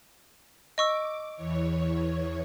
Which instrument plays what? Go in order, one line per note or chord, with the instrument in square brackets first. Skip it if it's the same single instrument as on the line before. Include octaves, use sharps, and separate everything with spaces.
[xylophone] D#5 C#6 E6 [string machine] D6
[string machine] E2 E3 C#5